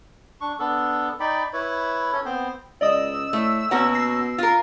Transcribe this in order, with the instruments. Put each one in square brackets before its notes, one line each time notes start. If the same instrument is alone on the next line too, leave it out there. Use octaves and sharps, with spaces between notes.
[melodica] D4 C#6
B3 D4 A4
D#4 D5 G5 B5
E4 B4 C#5
C#4 A4 C#5
B3 C4 C5
[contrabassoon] C#2 [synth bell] D5 D#5 D#6 [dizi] E6
[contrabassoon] A2 [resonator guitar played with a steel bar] A3
[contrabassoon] B2 [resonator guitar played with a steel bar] A#3 C#4 F#4 [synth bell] F#5
[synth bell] A#6 C7
[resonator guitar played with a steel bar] F4 A#4